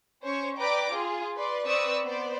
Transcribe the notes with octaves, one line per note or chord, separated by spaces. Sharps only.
C#4 C5 C#5 C#6
B4 D5 G5 A#5 D6
F4 G#4
B4 D5 C6
C4 B4 D5 C#6 D#6 E6
B3 C5 D5